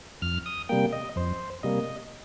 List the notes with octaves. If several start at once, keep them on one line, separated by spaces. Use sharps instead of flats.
F2 F6
D#6
C3 G3 A#3 G5
D#5
F2 C5
C3 G3 A#3 D#5